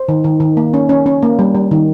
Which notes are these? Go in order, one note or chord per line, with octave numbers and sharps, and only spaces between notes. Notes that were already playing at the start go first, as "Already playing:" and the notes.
Already playing: C5
D#3
D#3
D#3
A#3
C#4
C#4
C#4
A#3
G3
G3
D#3